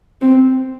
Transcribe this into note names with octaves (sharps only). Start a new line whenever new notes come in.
C4